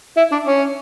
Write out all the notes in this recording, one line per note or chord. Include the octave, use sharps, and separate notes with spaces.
E4
D4
C#4